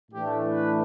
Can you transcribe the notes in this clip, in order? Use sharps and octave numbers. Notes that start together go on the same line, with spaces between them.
A2 E3 A3 D4 G4
B4